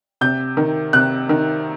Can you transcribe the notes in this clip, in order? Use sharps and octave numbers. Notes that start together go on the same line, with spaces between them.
C3 G6
D#3
C3 F#6
D#3